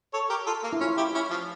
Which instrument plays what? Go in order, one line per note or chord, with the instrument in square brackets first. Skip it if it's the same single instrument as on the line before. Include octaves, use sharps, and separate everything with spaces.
[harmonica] A4 C#5
G4 A#4
F4 A4
A#3
[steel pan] E4
[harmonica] C#4 [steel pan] F4
[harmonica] E4 G4
C#4 E4
F3